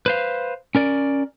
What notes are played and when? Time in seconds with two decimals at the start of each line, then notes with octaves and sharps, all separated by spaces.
0.06 B4 C5 F5
0.75 C#4 A#4 D5